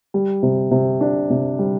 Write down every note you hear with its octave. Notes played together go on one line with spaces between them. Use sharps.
G3
C3
C3
D4
C3
G3